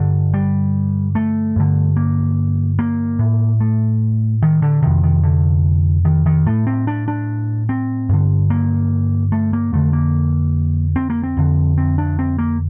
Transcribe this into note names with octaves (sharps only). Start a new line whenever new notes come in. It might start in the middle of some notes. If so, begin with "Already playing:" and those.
Already playing: G2 D3
G3
A3
G2 D3
A#3
A#3
A2
A3
D#3
D3
F2 C3 D#3
D#3
D3
D#3
D#3
A2 A3
C4
D4
D4
C4
G2 D3
A#3
A3
A#3
F2 D3 A3
A#3
C4
A#3
C4
F2 D3
C4
D4
C4
A#3